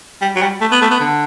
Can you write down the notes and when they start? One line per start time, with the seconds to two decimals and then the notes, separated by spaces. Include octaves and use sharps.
0.21 G3
0.35 F#3
0.42 G3
0.61 A3
0.72 B3
0.82 A3
0.91 B3
1.00 D3